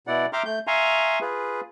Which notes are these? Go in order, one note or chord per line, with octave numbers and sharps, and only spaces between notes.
B2 E4 D5 F#5
E5 G5 A#5 C6 D6 F6
A3 G6
E5 F5 G#5 A#5 C6 C#6
F4 G#4 B4